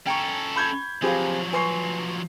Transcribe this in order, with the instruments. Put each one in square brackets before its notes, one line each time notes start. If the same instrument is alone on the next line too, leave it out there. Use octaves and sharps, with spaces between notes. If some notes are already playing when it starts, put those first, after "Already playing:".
[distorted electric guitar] C#4 A4 [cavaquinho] G5 A#5 C#6
[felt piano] B5 G6 G#6
[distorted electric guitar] F3 F#3 [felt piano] C4 G4 [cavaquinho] G#4 B4 F5
[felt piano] B4 C#6 C7 [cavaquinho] G#5 C6